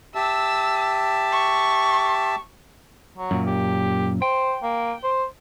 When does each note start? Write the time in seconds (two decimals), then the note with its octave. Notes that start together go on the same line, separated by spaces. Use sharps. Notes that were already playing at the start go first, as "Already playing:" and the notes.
0.15 G4 E5 A5 E6
1.32 C#6
3.18 F#3
3.31 F#2 A#2
3.47 G4
4.22 C5 G5
4.63 A#3
5.04 C5